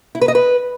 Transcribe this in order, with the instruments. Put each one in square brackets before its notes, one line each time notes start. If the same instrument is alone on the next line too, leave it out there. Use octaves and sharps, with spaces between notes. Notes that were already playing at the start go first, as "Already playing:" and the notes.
[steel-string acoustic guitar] E4
B4
D#5
B4